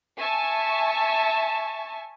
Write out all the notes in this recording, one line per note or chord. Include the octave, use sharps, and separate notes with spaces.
E5 G#5 A5 C#6